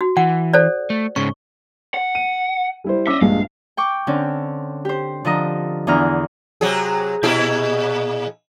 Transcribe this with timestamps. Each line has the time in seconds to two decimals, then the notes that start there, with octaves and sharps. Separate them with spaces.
0.01 F#4
0.17 E3 F#5
0.54 A4 C5 D5
0.90 A3
1.16 G#2 C#3 C#4 C#6
1.94 F#5
2.15 D#7
2.84 G3 E4 C5
3.07 C#4 D#5 E5 D6 E6
3.21 A#1 G2 G#3 F5
3.77 G5 C#6 D6
4.07 D3 C4 C#4
4.85 G4 C5
5.25 D3 F3 D#5 A#5
5.87 E2 D3 E3 B3 A#5 F6
6.61 C3 F#3 G#4
7.23 A#2 E4 G#4